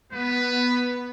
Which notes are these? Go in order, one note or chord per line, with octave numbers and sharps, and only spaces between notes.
B3 B4